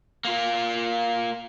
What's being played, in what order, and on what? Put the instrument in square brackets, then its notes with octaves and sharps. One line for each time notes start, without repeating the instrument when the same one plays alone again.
[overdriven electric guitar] A#3 F4